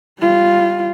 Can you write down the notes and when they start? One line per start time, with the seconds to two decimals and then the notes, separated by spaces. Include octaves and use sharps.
0.20 G3 F4